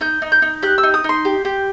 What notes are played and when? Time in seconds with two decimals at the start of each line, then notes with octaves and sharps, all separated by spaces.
0.01 D#4 G6
0.22 D#4
0.32 G6
0.42 D#4
0.63 G4 F#6
0.78 E6
0.83 D#4
0.94 D#6
1.04 D#4 C6
1.25 G4
1.45 G4